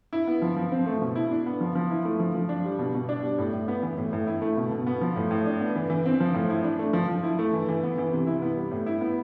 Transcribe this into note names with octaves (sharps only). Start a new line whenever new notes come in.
E4
B3
F3
F3
C4
A3
B2
E4
D4
B3
F3
F3
E4
A3
F3
F3
D4
G3
B2
B2
D4
G3
A2
A2
B3
E3
A2
A2
E4
A3
B2
B2
B3
F3
A2
A2
D4
B3
E3
E3
C4
F3
A2
E4
D4
A3
F3
F3
E4
A3
E3
E3
B3
E3
C3
E4
B3
G3
A2
E4
B3